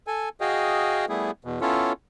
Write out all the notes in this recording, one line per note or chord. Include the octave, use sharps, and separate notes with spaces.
A4 G#5
F#4 G#4 D#5 F5 G5
G3 A3 B3 E4 G#4
E2 B2
B3 C#4 E4 F4 A4 C#5